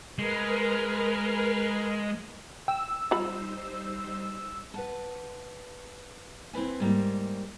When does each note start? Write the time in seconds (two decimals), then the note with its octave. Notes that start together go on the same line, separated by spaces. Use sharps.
0.18 G#3 A#4 B4 F6
2.68 G5 E6
3.11 G3 D#4 F4 C5 B5
4.74 B4 F#5 A5
6.53 C4 E4 B4 G#5
6.80 G#2 G3 A#3